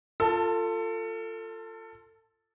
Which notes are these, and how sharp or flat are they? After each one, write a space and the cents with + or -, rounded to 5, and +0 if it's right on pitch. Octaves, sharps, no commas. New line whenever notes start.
F4 +0 A4 +25 A5 +0